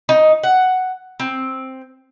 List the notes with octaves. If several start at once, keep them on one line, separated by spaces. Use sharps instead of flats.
D#4
F#5
C4